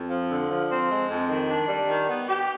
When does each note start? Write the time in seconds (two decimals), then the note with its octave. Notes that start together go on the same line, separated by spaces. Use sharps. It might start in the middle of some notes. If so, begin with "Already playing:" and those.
Already playing: F2
0.10 F3
0.29 D3
0.49 F3
0.69 C4
0.89 G#3
1.08 F2
1.29 D#3
1.49 D4
1.68 G3
1.89 D#3
2.08 B3
2.28 G4